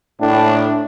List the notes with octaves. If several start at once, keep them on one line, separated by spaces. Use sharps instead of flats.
A2 D4